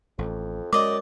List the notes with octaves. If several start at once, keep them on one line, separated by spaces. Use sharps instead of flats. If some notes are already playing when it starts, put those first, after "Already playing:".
A1 F2
F#2 G#3 D5 D#5 D6